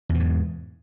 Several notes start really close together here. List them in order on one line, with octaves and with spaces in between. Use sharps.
E2 B2 G#2